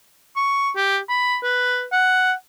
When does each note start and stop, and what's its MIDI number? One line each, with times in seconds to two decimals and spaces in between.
0.36 0.71 85
0.76 0.99 67
1.09 1.37 83
1.43 1.85 71
1.92 2.33 78